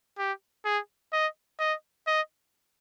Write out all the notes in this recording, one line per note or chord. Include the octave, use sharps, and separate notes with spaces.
G4
G#4
D#5
D#5
D#5